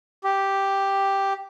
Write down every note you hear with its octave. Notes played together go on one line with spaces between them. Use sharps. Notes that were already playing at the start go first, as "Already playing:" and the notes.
G4